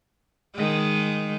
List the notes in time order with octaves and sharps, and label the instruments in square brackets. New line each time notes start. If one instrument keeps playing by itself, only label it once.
[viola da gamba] D#3 G#3